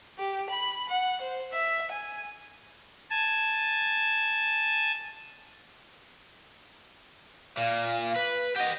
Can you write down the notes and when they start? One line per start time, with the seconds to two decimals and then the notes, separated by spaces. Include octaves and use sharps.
0.17 G4
0.49 B5
0.87 F#5
1.20 C5
1.52 E5
1.90 G#5
3.10 G#5 A5
7.57 A#2 F5
8.16 B4
8.56 G4 D#5 F#5